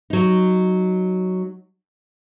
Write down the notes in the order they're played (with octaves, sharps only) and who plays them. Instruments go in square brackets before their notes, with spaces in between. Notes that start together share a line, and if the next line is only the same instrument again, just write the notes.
[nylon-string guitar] F#3 D#4